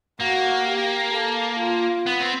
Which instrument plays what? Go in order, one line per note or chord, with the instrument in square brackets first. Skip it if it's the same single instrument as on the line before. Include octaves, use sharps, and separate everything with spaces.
[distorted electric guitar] A#3 [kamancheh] F#4
[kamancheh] G4
A4
F4
[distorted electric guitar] B3
C4